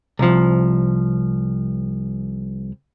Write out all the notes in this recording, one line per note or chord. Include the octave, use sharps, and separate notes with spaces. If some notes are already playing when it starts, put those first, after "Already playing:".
C2 F3